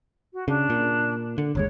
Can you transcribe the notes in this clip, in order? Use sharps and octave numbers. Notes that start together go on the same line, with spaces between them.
F#4
C#3 D4
A#2
D3
G1 D#2 G#3 C#5